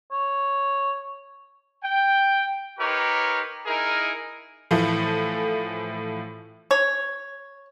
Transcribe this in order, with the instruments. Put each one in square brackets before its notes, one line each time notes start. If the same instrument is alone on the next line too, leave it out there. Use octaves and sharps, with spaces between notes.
[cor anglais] C#5
[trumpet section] G5
D#4 G4 A#4 B4 C#5
D#4 E4 G#4 A#4
[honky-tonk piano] A2 E3 F3 A3
[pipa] C#5